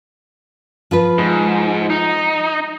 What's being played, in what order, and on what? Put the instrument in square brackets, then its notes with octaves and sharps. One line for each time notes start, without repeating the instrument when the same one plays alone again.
[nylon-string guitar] F3 F4 B4
[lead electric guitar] G#2
D#4